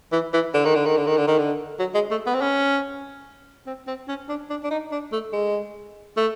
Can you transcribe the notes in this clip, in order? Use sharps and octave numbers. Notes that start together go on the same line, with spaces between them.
E3
E3
D3
D#3
D3
D#3
D3
D#3
D3
D#3
D3
F#3
G#3
A3
B3
C4
C#4
C4
C4
C#4
D4
D4
D4
D#4
D4
A3
G#3
A3